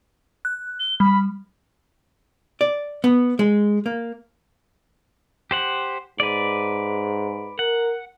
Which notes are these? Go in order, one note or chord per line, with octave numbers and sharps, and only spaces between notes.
F#6
G7
G3 B5
D5
B3
G#3
A#3
G4 C5 F#5
G#2 B4 D5
A#4 F#5